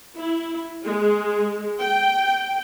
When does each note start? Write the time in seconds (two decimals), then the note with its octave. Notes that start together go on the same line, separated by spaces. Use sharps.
0.16 E4
0.84 G#3
1.81 G5